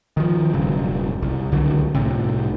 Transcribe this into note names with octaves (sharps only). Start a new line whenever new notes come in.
D#3 F3
E1 G2 C#3 F#3
C2
C#2 D3 F#3
C2 A2 C3